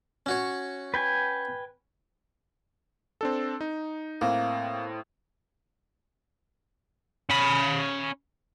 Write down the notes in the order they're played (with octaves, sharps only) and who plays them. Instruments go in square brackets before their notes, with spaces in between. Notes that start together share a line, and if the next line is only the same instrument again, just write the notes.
[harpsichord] C#4 F#4 C#5
[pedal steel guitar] B4 G5 G#5
[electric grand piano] C4 D4 A4
D#4
[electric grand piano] A2 C4 [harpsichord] A#3
[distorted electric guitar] C#4 B5